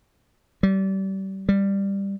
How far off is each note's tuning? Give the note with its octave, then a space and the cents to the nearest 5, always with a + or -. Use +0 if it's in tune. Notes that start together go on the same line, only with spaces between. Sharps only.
G3 -30
G3 +10